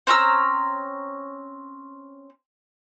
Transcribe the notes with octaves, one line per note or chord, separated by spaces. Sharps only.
C4 C#4 A#5 E6